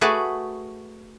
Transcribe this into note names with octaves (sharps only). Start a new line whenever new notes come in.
A3 F#4 G#4 B4 D5